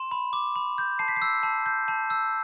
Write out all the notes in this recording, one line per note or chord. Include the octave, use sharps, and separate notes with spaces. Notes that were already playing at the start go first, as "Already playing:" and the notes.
Already playing: C6 E7
B5
D6
B5
G6
A5 C7
B6
C7
E6
A5
G6
A5
E6